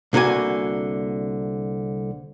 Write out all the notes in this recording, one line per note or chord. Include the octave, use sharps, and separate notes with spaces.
C2 D3 A#3 F#4 G#5